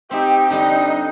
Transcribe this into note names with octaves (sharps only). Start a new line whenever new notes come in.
C4 D#4 G4 E5
D3 G3 D#4